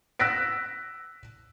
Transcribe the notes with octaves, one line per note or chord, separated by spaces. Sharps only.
E6 F#6 A#6 B6 D7